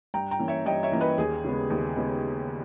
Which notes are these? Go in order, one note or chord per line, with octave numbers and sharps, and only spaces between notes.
G2 G5 A#5
G5 A#5
E3 A#3 C#4
C#5 E5
G2 D#5 G5
C#5 E5
E3 A#3 C#4
B4 D#5
D#2 G#4
C#3 G#3 B3
D#2
C#3 G#3 B3